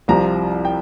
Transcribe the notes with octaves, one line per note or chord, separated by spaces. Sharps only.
C2 C3 F3 A#5
G5